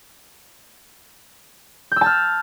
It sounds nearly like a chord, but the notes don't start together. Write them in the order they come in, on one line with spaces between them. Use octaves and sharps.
G6 E6 A5 F6